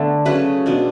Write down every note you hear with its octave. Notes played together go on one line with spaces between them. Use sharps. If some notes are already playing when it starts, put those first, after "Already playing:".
Already playing: D3 A3 B3 D4
C#3 F#3 A3 C#4 B4
B2 G#3 D4